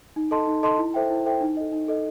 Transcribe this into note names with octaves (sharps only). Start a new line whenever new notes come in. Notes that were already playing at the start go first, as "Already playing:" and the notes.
D#4
A4 D#5 A5 C6
D#4
A4 D#5 A5 C6
E4
A4 C5 E5 G5
E4
A4 C5 E5 G5
D#4
A4 D#5
D#4
A4 D#5